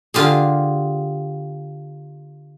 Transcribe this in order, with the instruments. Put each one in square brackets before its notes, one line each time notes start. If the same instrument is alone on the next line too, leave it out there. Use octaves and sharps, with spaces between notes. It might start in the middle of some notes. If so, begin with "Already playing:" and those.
[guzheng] D3 F4 G4 G#4